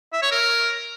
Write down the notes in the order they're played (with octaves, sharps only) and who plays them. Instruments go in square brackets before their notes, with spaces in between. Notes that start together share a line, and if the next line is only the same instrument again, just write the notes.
[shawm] E5
C#5
A#4